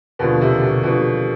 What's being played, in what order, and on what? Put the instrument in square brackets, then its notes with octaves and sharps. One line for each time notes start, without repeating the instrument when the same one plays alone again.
[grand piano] D#2 D3 F3 [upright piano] B2
[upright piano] C3
B2
[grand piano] D#2 D3 F3 [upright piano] B2